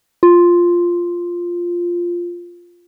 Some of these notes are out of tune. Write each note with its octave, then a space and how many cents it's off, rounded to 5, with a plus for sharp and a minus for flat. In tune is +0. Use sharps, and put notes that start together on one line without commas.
F4 +0